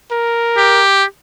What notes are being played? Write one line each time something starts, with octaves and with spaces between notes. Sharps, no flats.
A#4
G4